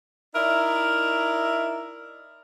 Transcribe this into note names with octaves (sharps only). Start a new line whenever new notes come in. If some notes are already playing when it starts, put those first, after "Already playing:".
D#4 E4 A#4 D5 E5